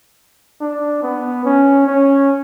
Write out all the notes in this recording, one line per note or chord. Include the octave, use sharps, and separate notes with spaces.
D4
B3
C#4
C#4